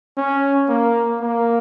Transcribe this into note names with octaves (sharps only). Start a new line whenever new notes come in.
C#4
A#3
A#3